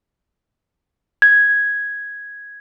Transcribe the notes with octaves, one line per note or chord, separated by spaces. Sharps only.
G#6